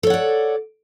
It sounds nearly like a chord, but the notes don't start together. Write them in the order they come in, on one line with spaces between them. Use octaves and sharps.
A4 C#5 F#5 D5